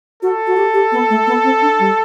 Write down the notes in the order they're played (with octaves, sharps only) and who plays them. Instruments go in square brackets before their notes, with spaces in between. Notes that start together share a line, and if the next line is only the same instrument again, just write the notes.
[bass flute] F#4 [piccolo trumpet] A4
[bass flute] F#4
G4
G4
B3
A3
B3
C4
D4
G3